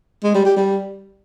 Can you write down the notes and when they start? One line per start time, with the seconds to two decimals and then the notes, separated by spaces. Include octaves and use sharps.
0.23 G#3
0.34 G3
0.45 G4
0.56 G3